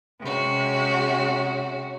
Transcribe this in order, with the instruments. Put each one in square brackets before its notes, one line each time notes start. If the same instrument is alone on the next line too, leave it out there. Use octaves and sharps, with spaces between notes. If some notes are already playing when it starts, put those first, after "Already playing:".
[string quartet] C3 G#3 C#4 F#4